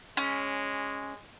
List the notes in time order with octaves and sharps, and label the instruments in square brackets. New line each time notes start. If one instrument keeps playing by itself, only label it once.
[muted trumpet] G#3 [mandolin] C#4